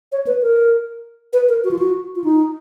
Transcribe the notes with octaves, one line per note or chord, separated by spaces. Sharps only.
C#5
B4
A#4
B4
A#4
F#4
F4
F#4
F4
D#4